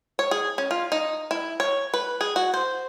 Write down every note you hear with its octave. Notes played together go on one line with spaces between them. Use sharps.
C#5
G#4
C#4
F4
D#4
E4
C#5
B4
G#4
F#4
C5